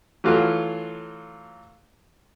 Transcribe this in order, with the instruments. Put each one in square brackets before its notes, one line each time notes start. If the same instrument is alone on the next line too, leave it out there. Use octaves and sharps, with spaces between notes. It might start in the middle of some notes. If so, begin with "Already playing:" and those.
[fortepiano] E3 F#3 A3 F4 F#4